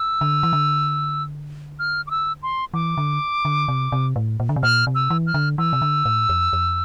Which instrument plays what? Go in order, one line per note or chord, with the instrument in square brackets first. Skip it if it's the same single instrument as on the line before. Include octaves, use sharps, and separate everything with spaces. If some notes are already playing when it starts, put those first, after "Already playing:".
Already playing: [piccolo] E6
[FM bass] D3
E3
D3
[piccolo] F6
D6
E6
C6
[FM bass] E3 [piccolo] D6
[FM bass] D3
D3
C3
C3
A2
A#2
D3
C3
[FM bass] A#2 [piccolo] F6
[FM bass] C3
[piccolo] E6
[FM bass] E3
[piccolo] F6
[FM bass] D3
[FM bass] E3 [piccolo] E6
[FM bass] C3
D3
A2
F2
F2